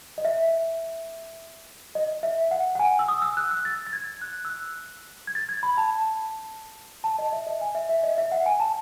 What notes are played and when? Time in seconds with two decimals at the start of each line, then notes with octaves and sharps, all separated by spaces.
0.18 D#5
0.25 E5
1.95 D#5
2.23 E5
2.51 F#5
2.75 F#5
2.79 G#5
2.99 E6
3.08 D#6
3.22 E6
3.37 F#6
3.51 E6
3.65 A6
3.87 A6
3.93 G#6
4.22 F#6
4.45 E6
4.50 F#6
5.27 G#6
5.35 A6
5.49 G#6
5.63 B5
5.78 A5
7.04 A5
7.19 D#5
7.33 E5
7.47 D#5
7.61 G#5
7.75 E5
7.89 E5
8.04 D#5
8.18 E5
8.32 F#5
8.46 G#5
8.60 A5